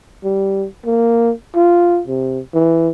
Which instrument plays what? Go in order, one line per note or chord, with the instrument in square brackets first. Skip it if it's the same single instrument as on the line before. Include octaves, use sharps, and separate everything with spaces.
[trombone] G3
A#3
F4
C3
E3